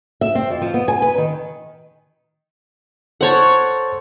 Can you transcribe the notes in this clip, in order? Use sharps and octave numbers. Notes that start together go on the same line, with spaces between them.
E5
C4
F2
F3
B3
G#5
B4
D#3
A4 C5 C#5 F#5 A5